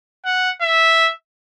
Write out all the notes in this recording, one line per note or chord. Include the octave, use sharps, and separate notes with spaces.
F#5
E5